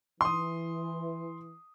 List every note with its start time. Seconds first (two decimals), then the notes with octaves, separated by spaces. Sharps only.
0.21 E3 C6 D#6